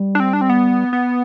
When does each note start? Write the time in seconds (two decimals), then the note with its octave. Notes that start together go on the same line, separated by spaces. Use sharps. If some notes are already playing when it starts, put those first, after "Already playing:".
Already playing: G3
0.15 D4
0.20 C4
0.33 D4
0.41 C4
0.49 B3
0.93 B3